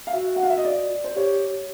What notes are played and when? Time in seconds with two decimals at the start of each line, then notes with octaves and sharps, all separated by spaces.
0.07 F5
0.13 F#4 E5
0.36 F#5
0.43 F5
0.50 E5
0.58 D#5
0.65 D5
1.04 C5
1.16 G4 C#5